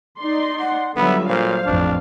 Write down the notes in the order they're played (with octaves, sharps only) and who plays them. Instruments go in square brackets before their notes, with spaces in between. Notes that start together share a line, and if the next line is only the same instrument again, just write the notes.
[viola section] D#4 D5 C6
[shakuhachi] F#5
[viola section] D3 F4 E5 [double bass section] F#3 G3 [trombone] B3 [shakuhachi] B5
[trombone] A#2 [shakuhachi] C5 [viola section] F5
[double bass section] A1 F2 F3 [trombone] D4